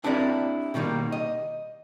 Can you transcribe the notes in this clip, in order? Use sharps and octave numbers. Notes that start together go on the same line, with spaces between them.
C4 D4 E4 G4 A#4 D5
B2 D#3 F#3 G3 A#3
D#5